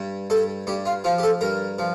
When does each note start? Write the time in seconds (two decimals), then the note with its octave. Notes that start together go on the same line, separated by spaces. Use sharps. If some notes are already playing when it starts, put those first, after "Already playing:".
Already playing: G2
0.30 G2 A4
0.67 G2 G4
0.86 F4
1.04 F3 F4
1.18 G4
1.23 A4
1.41 G2 A#4
1.79 F3